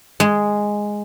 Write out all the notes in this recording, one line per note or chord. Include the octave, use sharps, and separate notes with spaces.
G#3